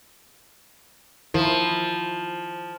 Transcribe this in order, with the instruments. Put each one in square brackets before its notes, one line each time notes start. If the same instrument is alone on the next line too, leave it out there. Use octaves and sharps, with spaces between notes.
[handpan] D#3 E4 A#4 [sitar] F3